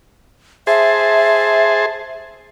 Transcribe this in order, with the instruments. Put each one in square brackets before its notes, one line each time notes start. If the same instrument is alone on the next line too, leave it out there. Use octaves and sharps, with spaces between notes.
[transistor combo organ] G#4 C5 A5 [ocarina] E5